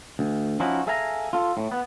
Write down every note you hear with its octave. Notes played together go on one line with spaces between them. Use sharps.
D2
F3 C#4 D#4 E4 F#4
G#4 A4 E5 F5 G#5 A#5
F4 A4
A2
B3